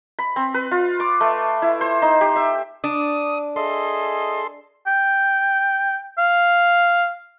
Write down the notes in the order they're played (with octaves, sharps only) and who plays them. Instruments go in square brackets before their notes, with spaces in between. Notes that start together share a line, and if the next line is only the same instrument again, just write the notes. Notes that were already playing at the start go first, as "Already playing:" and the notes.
[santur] B5
C4
B4
F4
D6
A3
E4
C5
D#4
G4
E5
[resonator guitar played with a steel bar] D4 [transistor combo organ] D#6
[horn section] G#4 D#5 E5 [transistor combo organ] A4 C6
[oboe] G5
F5